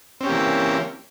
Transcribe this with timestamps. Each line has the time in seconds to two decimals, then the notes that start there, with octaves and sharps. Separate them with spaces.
0.21 C4
0.23 C#4
0.26 G4
0.29 A#3
0.32 E3